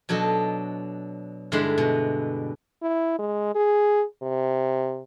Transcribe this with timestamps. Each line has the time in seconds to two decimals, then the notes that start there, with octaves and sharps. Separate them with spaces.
0.09 B2 F#3 D4 A4 D#5
1.52 G2 D3 G#3 E4 B5 C6
1.78 B2
2.82 E4
3.19 G#3
3.55 G#4
4.23 C3